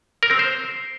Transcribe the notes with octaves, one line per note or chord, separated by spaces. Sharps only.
A#4
C4
C5